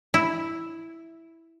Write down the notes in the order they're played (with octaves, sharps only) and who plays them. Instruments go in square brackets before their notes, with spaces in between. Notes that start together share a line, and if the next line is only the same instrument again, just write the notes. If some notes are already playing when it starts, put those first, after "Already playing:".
[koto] E4